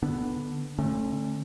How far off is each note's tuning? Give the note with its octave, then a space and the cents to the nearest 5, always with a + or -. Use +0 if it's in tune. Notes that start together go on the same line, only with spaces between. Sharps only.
D3 +0 B3 +0 D4 +0
D3 +0 A3 +0 C#4 -35